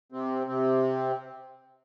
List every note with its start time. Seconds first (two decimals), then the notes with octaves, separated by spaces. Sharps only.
0.12 C3 C4
0.47 C3 C4